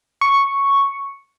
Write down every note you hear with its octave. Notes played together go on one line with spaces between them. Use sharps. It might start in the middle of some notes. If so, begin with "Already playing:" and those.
C#6